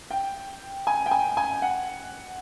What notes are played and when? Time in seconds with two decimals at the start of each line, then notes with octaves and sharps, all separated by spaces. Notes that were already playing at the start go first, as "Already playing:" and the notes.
0.11 G5
0.87 G#5
1.06 G5
1.11 G#5
1.37 G#5
1.62 F#5